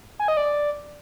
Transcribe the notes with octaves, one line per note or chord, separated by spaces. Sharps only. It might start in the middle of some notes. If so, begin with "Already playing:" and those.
G#5
D#5
D5